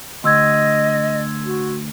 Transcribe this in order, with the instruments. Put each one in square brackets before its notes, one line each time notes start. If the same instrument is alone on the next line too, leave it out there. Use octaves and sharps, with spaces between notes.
[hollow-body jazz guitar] D2 [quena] D#5 [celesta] C6 E6 G#6
[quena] F#4